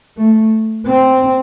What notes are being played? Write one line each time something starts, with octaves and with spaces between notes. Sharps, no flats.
A3
C4